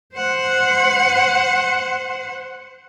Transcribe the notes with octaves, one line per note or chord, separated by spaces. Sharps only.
C5 F#5